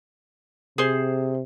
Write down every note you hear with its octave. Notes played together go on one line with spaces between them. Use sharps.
C3 G#4 C5